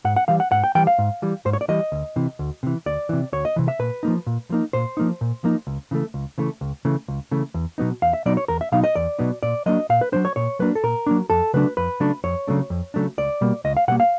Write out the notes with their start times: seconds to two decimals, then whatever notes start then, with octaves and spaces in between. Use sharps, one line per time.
0.05 G#2 F#5
0.16 F#5
0.28 E3 G3 F5
0.40 F#5
0.51 G#2 F#5
0.64 G5
0.75 E3 G3 G5
0.87 F5
0.98 G#2
1.22 E3 G3
1.45 G#2 C5
1.53 C#5
1.61 D5
1.68 E3 G3 D#5
1.92 D2
2.16 C3 E3
2.39 D2
2.63 C3 E3
2.86 D2 D5
3.09 C3 E3
3.33 D2 C#5
3.45 D#5
3.56 C3 E3
3.68 E5
3.79 A#2 B4
4.03 F3 A#3 D#4
4.27 A#2
4.50 F3 A#3 D#4
4.73 A#2 C5
4.97 F3 A#3 D#4
5.21 A#2
5.44 F3 A#3 D#4
5.67 C#2
5.91 C#3 E3 A3
6.14 C#2
6.38 C#3 E3 A3
6.61 C#2
6.85 C#3 E3 A3
7.08 C#2
7.31 C#3 E3 A3
7.54 E2
7.78 B2 F#3 B3 D#4
8.02 E2 F5
8.13 E5
8.26 B2 F#3 B3 D#4 D5
8.37 C#5
8.48 E2 A#4
8.61 E5
8.72 B2 F#3 B3 D#4 F5
8.84 D#5
8.96 E2 D5
9.19 B2 F#3 B3 D#4
9.43 A#2 D5
9.66 F#3 A#3 D4 D#5
9.89 A#2 F5
10.01 B4
10.12 F#3 A#3 D4 C5
10.25 C#5
10.36 A#2 C#5
10.59 F#3 A#3 D4 B4
10.75 A4
10.83 A#2 A#4
11.07 F#3 A#3 D4
11.30 F2 A4
11.54 C#3 F#3 A3 D4 B4
11.77 F2 B4
12.00 C#3 F#3 A3 D4
12.24 F2 C#5
12.48 C#3 F#3 A3 D4
12.70 F2
12.94 C#3 F#3 A3 D4
13.18 C#2 D5
13.41 B2 G3 A#3
13.64 C#2 D#5
13.77 F5
13.88 B2 G3 A#3 F#5
14.00 F5